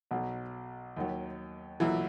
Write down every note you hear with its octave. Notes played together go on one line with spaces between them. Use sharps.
B1 B2 F#3
D#2 D#3 F#3
B1 A#2 E3 F#3 E4